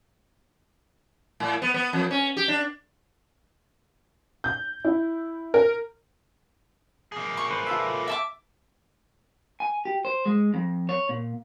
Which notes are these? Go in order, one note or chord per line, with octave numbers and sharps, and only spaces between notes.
A2
B3
B3
F2
C#4
G4
D4
G6
E4
A#4
A#3 G#4
C#6
B4 C5
F4 A4 E5
E5 A5 D6
G#5
G4
C5
G#3
F2
C#5
A#2